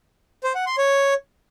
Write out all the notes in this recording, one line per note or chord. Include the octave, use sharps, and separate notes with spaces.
C5
F#5
C6
C#5